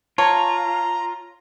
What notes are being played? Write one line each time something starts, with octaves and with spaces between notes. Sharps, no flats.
F4 C#5 A5 A#5